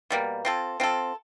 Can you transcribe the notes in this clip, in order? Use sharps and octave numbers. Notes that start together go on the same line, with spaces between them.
B2 G3 A#3
C4 F4 A4
C4 F4 A4